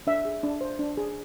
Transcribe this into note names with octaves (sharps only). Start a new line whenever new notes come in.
D4 E5
G#4
D4
C5
D4
G#4